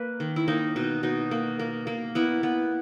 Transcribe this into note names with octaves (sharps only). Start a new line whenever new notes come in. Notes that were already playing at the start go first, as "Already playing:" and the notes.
Already playing: A#3 B4
D#3
E4
A#3 D#4
B2 D#4
B2 D#4
A#3
A#3
A#3
B3 E4
B3